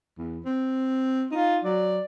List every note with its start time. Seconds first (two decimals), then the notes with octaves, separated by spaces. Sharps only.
0.18 E2
0.45 C4
1.31 D#4 F4
1.64 F#3 D5